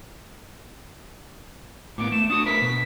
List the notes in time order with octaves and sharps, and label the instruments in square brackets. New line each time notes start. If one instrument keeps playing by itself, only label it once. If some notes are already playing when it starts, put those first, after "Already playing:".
[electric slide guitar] A2 A#3 B3 [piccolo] D6
[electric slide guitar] A3 [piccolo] E7
[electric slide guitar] D4 F#4 [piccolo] D#6
[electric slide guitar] A3 A#4 B4 [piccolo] B6
[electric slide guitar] B2